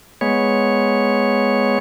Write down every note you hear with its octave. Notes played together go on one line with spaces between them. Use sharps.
G#3 B3 C#5